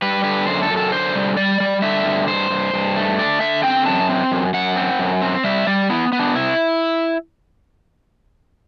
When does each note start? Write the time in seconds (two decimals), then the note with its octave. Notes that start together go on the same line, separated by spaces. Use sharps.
0.02 G3 B4
0.24 D3 B4
0.47 F#2 C5
0.62 A4
0.70 F#2
0.77 A4
0.92 D3 C5
1.16 G3
1.37 G3 D5
1.60 G3
1.82 D3 E5
2.05 G2
2.28 G2 C5
2.50 G2
2.74 G2
2.96 A3
3.19 D3 D5
3.41 D3 E5
3.63 C4 G5
3.86 F#2 A5
4.09 C4
4.32 F#2
4.54 F#2 F#5
4.76 C4
4.99 F#2
5.22 C4
5.44 G3 E5
5.67 G3 D5
5.90 B3 E4
6.12 B3
6.19 D4
6.35 C3 E4